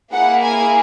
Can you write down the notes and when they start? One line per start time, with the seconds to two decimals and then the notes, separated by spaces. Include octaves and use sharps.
0.13 A#3 E4 G#4 F#5
0.42 G#5